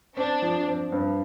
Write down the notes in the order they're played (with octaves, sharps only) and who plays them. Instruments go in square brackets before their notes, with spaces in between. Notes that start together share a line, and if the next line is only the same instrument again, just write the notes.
[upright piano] C4 [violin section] D4
[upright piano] F3
C4
G2